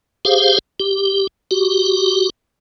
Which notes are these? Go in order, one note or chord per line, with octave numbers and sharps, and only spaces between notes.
G4 G#4 C5 F5
G4
F#4 G4